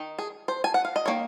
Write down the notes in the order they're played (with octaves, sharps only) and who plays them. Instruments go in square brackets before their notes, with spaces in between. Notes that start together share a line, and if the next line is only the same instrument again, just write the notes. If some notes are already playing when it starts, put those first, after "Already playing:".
Already playing: [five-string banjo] D#3 D#4
G#4
C5
G#5
F#5
F5
D#5
D#3 A#3 C#5